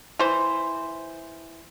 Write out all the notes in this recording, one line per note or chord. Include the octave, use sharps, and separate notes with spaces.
E3 C5